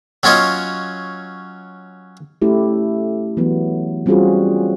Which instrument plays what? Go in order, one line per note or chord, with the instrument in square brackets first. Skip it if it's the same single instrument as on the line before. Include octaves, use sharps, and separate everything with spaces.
[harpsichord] F#3 C#4 F4 C#5 D#5
[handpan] A3 C#4 E4 G4
E3 F#3 B3
G3 C4 C#4 F4 F#4 G#4